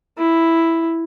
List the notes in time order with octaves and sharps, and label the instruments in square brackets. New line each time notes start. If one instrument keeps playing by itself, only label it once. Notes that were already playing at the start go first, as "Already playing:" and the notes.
[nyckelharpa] E4